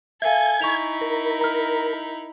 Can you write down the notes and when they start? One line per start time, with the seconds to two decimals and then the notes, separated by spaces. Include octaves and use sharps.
0.22 A4 E5 F5 G#5 G#6
0.62 D#4 E4 C#6 F7
1.01 A#4
1.41 A#5 F6